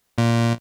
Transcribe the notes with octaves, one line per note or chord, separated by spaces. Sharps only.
A#2